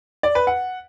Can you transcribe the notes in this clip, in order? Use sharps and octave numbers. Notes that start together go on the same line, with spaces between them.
D5
B4
F#5